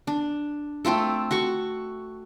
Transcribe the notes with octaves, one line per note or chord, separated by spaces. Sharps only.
D4
A3 C4 F4 A4
F#4 A4 C#6